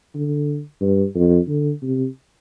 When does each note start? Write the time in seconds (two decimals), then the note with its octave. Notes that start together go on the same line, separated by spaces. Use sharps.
0.15 D3
0.81 G2
1.15 F2
1.49 D3
1.82 C3